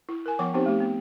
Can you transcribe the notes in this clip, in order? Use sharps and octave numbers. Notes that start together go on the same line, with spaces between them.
E4
A#4 G#5
F3 B3 C#5 F#5 C#6
B3 C4 D#4 G4 C5
A3 G4
B3